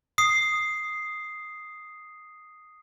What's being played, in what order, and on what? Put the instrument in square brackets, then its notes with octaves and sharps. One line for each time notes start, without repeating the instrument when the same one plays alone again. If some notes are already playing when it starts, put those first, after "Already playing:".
[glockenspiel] D#6 C7